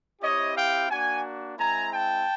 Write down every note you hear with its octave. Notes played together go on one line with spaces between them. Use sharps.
C4 E4 G4 C#5 D#5
F5 G5
A#3 D4 F#4 F#5 G#5
G#3 C4 E4 G#5 A#5
G5 A5